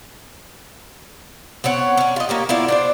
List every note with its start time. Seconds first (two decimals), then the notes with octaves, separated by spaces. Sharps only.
1.64 B3 C4 C#5 F#5
1.97 C#4 D4
2.16 F4 D#5
2.29 A#3 C#4 G4
2.49 B3 E4 F4 D5
2.68 D4 C5 D5